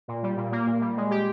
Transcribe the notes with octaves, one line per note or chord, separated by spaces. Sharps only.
A#2
G3
A#2
A#3
A#2
G3
G#3
G4